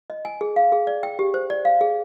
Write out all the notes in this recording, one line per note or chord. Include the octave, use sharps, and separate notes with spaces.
D#5
G#5
G#4
F5
G#4
D5
G5
G4
C5
D5
F5
G#4